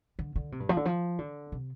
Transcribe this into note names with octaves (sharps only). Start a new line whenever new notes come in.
D3
D3
C3
G2
F3
D3
F3
D3
C3